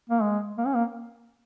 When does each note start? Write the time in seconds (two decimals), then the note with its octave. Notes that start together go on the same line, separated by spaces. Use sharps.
0.10 A#3
0.22 G#3
0.58 A#3
0.66 C#4
0.75 A#3